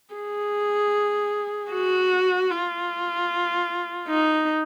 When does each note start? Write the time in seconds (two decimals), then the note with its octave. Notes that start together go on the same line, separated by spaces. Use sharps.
0.15 G#4
1.72 F#4
2.51 F4
4.08 D#4